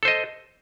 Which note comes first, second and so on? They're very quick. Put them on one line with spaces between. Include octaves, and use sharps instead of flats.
A4 C5 D#5